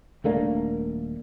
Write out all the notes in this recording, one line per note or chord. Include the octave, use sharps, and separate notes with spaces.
D#1 A3 A#3 D4